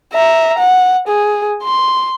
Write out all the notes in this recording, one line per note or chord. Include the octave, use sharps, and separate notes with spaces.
E5 A#5
F#5
G#4
C6